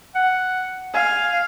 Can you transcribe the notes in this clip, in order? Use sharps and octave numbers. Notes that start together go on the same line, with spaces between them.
F#5
F5 G#5